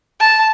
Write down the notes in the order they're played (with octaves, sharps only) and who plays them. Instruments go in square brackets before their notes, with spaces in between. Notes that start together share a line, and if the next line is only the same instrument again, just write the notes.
[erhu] A5